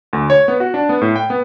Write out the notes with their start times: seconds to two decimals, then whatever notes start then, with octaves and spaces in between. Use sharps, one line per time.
0.13 D2
0.30 C#5
0.48 B3
0.60 F#4
0.74 D4
0.89 B3
1.02 A2
1.16 G5
1.30 B3